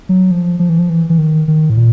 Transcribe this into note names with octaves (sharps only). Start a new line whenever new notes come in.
F#3
F3
F3
E3
F3
E3
E3
D#3
D#3
A2
A#2